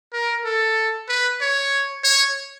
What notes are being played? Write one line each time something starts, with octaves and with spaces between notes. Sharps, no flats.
A#4
A4
B4
C#5
C#5